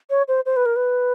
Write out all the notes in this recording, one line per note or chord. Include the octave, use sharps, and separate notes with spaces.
C#5
C5
C5
B4
A#4
B4